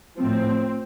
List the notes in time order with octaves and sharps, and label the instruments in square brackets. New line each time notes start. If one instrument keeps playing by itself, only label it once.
[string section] A2 F3 C4